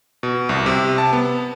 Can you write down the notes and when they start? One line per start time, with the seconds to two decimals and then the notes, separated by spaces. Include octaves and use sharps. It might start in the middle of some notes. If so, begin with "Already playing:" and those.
0.23 B2
0.49 C2
0.66 C3
0.98 A5
1.13 B3